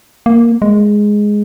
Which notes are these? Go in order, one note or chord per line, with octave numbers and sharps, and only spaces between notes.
A#3
G#3